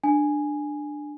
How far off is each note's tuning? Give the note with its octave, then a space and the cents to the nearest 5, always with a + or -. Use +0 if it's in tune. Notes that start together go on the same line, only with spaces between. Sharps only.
D4 +15 G#5 +0